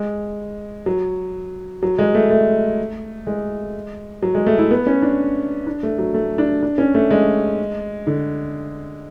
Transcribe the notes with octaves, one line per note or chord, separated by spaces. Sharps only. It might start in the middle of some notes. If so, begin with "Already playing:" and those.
Already playing: G#3
F#3
F#3
G#3
A3
A3
G#3
F#3
G#3
A3
E4
B3
C#4
D4
D4
A3
F#3
A3
D4
D4
C#4
A3
G#3
D3